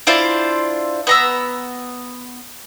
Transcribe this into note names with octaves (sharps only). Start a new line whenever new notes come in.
D4 E4 F4 C5
B3 A#5 E6